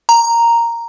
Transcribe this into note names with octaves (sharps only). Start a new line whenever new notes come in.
A#5